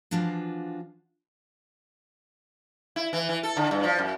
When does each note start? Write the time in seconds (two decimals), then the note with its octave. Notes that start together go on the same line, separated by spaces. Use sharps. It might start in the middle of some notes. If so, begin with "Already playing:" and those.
0.11 E3 F3 D4 F4 F#4
2.96 E4
3.13 E3
3.29 E3
3.43 A4
3.57 D3
3.71 G2
3.84 F3
3.98 F#2